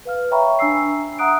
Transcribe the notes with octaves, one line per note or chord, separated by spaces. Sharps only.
B4 F5 F6
C#5 E5 G5 A#5 B5 C#6
D4 G#5 E6 C7
E5 F#5 A#5 D#6 F#6 D7